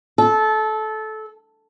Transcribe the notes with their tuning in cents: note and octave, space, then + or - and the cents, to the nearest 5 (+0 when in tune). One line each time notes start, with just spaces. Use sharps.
A4 -20